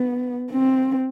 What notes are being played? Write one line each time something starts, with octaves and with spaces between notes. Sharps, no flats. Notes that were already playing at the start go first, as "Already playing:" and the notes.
Already playing: B3
C4